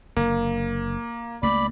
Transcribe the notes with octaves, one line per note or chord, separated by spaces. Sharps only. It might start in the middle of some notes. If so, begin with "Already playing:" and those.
F#1 D3 A#3
C#2 A3 A#3 D5 B5